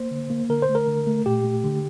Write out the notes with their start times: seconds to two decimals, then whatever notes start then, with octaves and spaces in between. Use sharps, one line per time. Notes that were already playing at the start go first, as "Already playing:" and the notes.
Already playing: A#3 C5
0.11 D3
0.30 A#3
0.50 D3 A#4
0.62 C5
0.69 A3
0.75 A#4
0.87 D3
1.07 A3
1.26 A#2 G4
1.44 A3
1.64 D3